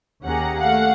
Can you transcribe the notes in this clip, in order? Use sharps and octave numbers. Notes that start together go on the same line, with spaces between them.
D#2 C#4 G4 G#4 F#5 A#5
A3 F5 F#5